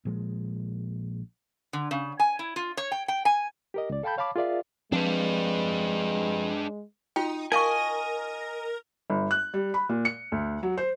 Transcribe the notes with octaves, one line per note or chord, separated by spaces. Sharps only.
A#1 A#2 F3 G#3
D3
C#3
G#5
E4
F4
C#5
G5
G5
G#5
G4 A#4 D#5
C#2 D5
A4 F5 G5 A5 B5 G6
C#5 F5 A5 B5 D6
F4 G#4 A#4 D5 E5 F5
F3 G#3 C4 D4 B4
D#4 F4 F#4 G5
D#4 A#4 D#5 F5 G#5 C#6
G1
F#6
G3
B5
A#2
C#7
D2
F#3
C5